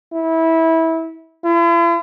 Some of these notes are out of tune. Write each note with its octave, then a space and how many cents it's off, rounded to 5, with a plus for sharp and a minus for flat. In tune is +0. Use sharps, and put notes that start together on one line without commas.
E4 -20
E4 +45